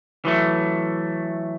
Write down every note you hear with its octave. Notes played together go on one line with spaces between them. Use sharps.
E3 F#3 A3